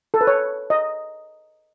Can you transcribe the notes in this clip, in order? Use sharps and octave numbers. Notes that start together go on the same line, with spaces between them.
A4
B4
C#5
D#5